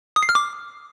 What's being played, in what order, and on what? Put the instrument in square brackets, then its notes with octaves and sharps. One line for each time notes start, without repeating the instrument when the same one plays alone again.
[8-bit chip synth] D#6
C7
F6
D6